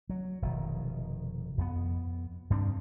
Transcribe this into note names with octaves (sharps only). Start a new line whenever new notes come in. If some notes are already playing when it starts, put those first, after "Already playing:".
F#3
F1 B2 D#3
F2 B3
G2 G3 C4 D4